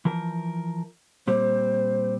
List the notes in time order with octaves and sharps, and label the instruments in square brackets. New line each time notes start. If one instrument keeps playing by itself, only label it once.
[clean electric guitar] E3 F3 A#4
[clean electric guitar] A#2 G3 C4 [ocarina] C5